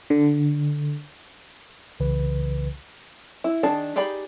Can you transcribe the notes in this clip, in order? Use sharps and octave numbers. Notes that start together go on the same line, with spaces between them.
D3
C2 C#3 E3 B4
E4
D#3 D4 G#4 A5
D#4 G4 G#4 D5 B5